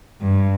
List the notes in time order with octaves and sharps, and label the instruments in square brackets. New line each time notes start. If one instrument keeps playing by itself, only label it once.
[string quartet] G2